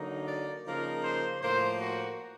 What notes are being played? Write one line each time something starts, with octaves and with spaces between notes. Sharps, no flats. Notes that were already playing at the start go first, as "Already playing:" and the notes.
Already playing: D3 F#3 A#3 D#4
D5
C#3 F3 A#3 D#4 A#4
C5
A2 F3 A#3 C5
F#4